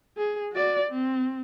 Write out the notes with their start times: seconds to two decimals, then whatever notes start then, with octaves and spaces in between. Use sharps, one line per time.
0.18 G#4
0.52 F#4 D5
0.90 C4